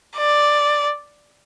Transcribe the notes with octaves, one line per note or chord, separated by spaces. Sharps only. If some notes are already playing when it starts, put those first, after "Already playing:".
D5